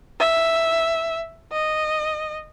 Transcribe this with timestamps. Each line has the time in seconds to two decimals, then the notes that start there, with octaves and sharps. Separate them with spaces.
0.20 E5
1.53 D#5